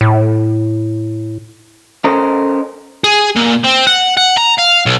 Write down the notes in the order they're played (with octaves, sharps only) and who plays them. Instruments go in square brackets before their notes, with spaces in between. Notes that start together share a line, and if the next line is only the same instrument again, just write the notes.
[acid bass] A2
[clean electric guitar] C#4 A4 A#4 C5 D#5
[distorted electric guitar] G#4
A#2
C4
F#5
F#5
A#5
F5
B1